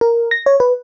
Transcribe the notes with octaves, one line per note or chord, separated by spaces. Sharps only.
A#4
A#6
C#5
B4